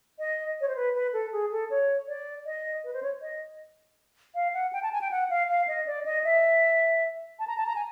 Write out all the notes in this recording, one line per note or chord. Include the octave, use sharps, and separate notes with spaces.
D#5
C#5
C5
B4
B4
A4
G#4
A4
C#5
D5
D#5
B4
C5
C#5
D#5
F5
F#5
G5
A5
G#5
G5
F#5
F5
F5
D#5
D5
D#5
E5
A5
A#5
A5
A#5
G#5